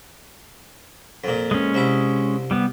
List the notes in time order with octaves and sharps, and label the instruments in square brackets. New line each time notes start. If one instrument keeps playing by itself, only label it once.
[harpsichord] F2 A#2
[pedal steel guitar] G#3 C#4
[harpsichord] C2 E4
[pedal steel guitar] G3 B3